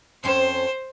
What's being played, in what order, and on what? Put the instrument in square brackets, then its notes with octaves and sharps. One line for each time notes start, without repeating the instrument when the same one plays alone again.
[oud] F2 C4 C#4 [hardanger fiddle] C5